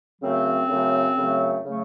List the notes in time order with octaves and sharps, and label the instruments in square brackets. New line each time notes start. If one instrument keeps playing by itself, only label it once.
[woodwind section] F#2 C#3 F#3 A3 C4
F#2 C#3 F#3 A3
F#2 C#3 F#3 A3
C#3 F#3 A3